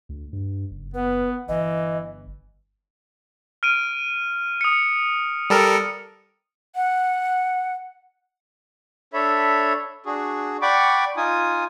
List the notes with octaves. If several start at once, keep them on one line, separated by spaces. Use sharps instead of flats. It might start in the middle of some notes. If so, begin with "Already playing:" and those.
D2
G2
F#1
B3 B4
G1 E3 D#5
F6 D7 D#7
D#6 C#7
G3 A4 A#4
F#5
D4 A4 C#5 E5 B5
D4 F#4 G#4
D5 F#5 G5 B5 C#6 D6
D#4 F4 G#5 D#6